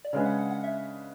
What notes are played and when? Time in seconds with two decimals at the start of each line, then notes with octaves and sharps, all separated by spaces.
0.05 D5
0.13 C#3 G#3 D4 G#4 B4 C#5
0.26 F#5
0.39 F#5
0.51 F#5
0.64 E5